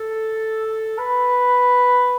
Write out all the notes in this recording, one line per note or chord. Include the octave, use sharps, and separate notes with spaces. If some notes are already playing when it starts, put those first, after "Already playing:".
Already playing: A4
B4